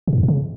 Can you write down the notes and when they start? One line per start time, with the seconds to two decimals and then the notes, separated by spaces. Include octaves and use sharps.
0.07 B2
0.13 G#2
0.18 E2
0.23 G#2
0.28 C#3